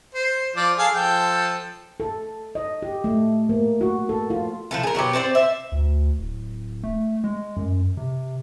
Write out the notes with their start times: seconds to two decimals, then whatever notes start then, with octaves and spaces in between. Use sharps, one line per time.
0.14 C5
0.56 F3 D5
0.78 G#4 A4 F5
0.94 F3 A4 G5
2.00 A4
2.55 D#5
2.82 G4
3.04 A3
3.49 A#3
3.81 F#4
4.09 A4
4.30 F4
4.71 F3 F#3 A3
4.83 G#4 A#4
4.95 B2 F#3 B3 G4
5.13 C4 D4 C5 D5
5.35 E5
5.72 D2
6.18 D1
6.83 A3
7.24 G#3
7.56 F#2
7.97 C3